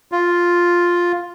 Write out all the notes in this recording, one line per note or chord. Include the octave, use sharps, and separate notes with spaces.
F4